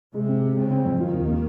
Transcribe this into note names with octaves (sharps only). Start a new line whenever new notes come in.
C3 G#3
C4
G#3
C#3 C4
C4
F2
D#3 F4
D#2
A#3